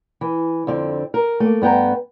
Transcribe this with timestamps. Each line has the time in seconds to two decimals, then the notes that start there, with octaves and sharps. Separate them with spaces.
0.21 E3
0.67 F2 D3 C4
1.14 A#4
1.40 A3 A#3
1.62 G2 B3 G5 A#5